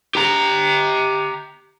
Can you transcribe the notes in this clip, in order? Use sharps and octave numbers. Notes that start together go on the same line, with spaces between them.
G4 A#5